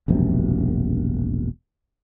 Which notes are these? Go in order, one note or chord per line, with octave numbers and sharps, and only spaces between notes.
E1 A#1 F#2 C3